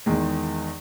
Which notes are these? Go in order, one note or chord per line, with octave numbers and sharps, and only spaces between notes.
E2 D#3 G#3